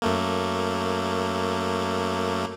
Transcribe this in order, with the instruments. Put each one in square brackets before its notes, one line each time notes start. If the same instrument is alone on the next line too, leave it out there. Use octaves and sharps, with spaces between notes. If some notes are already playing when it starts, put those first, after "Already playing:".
[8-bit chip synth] F#2 A3 A#3